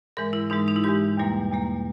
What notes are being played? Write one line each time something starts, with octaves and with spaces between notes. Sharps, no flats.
G#2 E3 G#3 A#4
E4
G#2 E3 G#3 D#4
D#4
E4
G#2 E3 G#3 G4
E2 B2 G3 A#3
E2 B2 G3 A#3